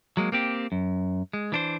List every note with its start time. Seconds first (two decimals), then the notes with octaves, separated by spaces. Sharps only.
0.17 F#3 G#3 A#3
0.32 A#3 C4 G4
0.72 F#2
1.33 G#3
1.52 E3 D4 C5